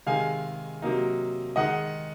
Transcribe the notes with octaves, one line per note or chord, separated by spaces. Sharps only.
C3 D#3 G#3 F5 G#5
C3 F#3 A#3 D#4
D#3 G#3 D#4 D#5 F#5